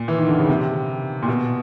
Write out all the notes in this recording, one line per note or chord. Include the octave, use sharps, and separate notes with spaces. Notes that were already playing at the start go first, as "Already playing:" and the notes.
Already playing: A#2
E3
D#3
D3
C#3
C3
A#2
B2